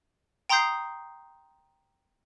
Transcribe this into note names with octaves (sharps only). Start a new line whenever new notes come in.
G5 A#5 C6 D#6 G6 C7